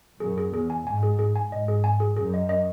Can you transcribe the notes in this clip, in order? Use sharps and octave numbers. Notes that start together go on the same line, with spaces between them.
F#2 G#4
G#4
E2 G#4
G#5
G#2 G#5
G#4
G#4
G#5
G#2 D#5
G#4
G#5
G#4
F#2 G#4
D#5
D#5